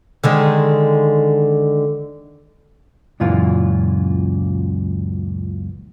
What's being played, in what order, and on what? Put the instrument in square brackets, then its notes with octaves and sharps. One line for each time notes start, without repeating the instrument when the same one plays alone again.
[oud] D3 D#3 G#3
[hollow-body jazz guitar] C#2 F#2 A#2 E3 F4